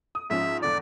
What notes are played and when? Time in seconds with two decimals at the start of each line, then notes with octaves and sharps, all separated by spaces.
0.15 D#6
0.30 G#2 F3 C#4 E5
0.62 G#1 E2 D3 D5